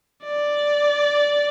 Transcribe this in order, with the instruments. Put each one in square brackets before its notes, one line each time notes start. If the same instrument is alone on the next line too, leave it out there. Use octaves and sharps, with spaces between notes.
[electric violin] D5